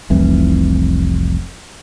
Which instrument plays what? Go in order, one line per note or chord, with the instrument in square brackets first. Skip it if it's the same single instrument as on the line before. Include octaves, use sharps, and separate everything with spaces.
[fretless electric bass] F1 C2 E3